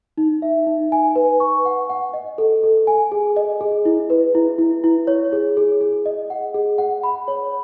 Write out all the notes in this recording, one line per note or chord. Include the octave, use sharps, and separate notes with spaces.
D#4
E5
D#4
G#5
B4
C#6
F#5
F#5
D#5
A4
A4
G#5
G#4
D#5
G#4
E4
B4
E4
E4
E4
C#5
G#4
G#4
G#4
D#5
F#5
G#4
F#5
B5
C#5